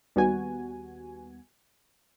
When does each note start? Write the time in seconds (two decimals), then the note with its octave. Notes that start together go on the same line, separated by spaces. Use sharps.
0.16 D#2 G3 B3 F#4 G#5